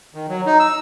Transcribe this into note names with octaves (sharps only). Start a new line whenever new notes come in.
D#3
F#3
D#4
E6